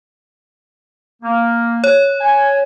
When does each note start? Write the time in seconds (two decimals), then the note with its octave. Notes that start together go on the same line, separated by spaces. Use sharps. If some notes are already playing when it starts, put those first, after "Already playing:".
1.23 A#3
1.84 C#5
2.21 G#5